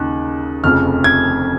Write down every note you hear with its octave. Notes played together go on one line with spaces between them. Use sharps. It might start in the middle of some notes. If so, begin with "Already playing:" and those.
Already playing: D#2 C#3 D#4 F#6
F1 F2 C#3 F6
G#6